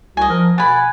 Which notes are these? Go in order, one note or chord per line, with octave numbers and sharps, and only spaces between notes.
C2 F#4 D#5 G#5
F3 A#4
B2 D5 F#5 G#5 B5